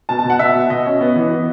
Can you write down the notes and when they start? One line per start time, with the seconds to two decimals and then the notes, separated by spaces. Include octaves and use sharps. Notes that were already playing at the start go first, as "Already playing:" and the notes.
0.09 B2 A5
0.19 A5
0.24 B2
0.30 F#5
0.39 B2 E5
0.55 B2
0.70 B2 D#5
0.85 C#4
1.01 B3
1.16 E3
1.30 B3